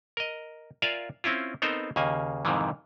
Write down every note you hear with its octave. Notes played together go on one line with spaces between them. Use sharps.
A#4 D#5
F4 A#4 D5 E5 F5 G#5
C4 C#4 E4 F4
B3 C4 D#4 A4 A#4 C5
D#2 C#3 A#3 G#5
F2 G#2 C3 D#3 E3